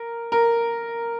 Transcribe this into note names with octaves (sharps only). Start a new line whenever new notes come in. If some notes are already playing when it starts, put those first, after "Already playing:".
Already playing: A#4
A#4